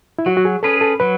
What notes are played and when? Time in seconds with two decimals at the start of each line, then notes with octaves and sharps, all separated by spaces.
0.19 E4
0.26 F#3 F#4
0.37 F#4
0.45 G#4
0.63 C#4 G#4 A4 B4
0.81 A4
1.00 F#3 B4